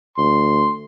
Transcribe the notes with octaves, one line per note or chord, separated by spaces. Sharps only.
D2 C6